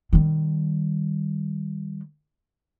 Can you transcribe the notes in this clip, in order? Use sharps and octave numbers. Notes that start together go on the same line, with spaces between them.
D#3 G3